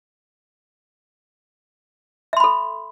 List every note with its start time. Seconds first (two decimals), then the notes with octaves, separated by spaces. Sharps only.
2.33 E5
2.37 C6
2.40 B5
2.44 A4